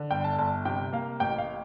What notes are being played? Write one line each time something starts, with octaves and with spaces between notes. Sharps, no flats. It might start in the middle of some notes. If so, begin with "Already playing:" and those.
Already playing: D3
G1 G5
A5
G1 A5
C3 G5
A#3 F5
A1 G5
F5